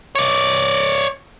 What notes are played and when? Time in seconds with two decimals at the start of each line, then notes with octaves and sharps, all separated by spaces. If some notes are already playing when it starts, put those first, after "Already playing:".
0.15 C#5 D5